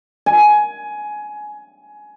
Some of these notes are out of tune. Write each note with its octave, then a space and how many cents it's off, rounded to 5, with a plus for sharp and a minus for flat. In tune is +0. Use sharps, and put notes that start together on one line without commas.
G#5 +15